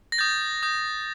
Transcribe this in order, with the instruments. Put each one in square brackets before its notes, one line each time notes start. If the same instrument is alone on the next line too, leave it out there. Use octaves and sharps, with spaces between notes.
[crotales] A#6
D#6 G6 A6
D#6 G6